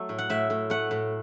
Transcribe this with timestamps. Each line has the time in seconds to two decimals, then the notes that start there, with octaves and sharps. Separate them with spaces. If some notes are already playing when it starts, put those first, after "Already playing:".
Already playing: F#3 A3 A4
0.09 A2
0.18 F#5
0.30 A2 E5
0.50 A2
0.70 A3 F#5
0.91 A2